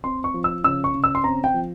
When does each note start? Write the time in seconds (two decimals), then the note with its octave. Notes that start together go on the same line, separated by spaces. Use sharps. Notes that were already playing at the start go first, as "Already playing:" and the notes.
0.04 C4 C6
0.24 C#6
0.34 F3
0.44 E6
0.64 C#3 E6
0.84 C#6
0.94 C#3
1.04 E6
1.15 C6
1.24 C4 A#5
1.44 G5
1.54 F3